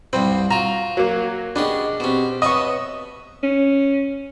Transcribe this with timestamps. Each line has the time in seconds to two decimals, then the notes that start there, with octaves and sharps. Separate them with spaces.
0.13 C2 G2 C4 B4
0.51 F4 F#4 A#5
0.97 F#3 A#3
1.56 B3 C#4 D4 G4 G#4 D#5
2.00 B2 C4 C#4 G4
2.42 B3 B4 C#5 D#5 E5 A5 C#6
3.43 C#4